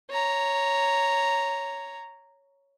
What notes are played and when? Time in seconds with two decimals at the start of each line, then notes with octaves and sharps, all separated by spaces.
0.11 C#5 A#5